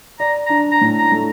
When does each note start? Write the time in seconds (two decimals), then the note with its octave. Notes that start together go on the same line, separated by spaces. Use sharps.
0.19 D5 A#5
0.46 D4 A#5
0.71 A#5
0.81 A2
0.98 A#5
1.12 A3